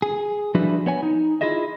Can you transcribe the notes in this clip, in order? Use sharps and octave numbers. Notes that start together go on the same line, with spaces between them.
G#4
F3 G3 D4 E4 F#4 B4
B3 C#5 G#5
D#4
E4 F4 G#4 D#5 E5